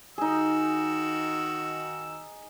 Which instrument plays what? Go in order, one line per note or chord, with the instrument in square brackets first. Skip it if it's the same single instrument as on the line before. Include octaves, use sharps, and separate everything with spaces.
[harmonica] D#3 F#4 E6 [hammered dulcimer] D#4 G#4